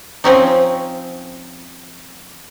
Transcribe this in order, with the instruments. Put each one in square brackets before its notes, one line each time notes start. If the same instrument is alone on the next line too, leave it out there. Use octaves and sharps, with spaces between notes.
[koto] F3 C4 C#4 D#4